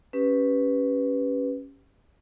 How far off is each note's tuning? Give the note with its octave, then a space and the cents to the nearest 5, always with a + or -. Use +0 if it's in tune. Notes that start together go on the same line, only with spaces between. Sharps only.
C#4 +0 G4 +0 B4 +0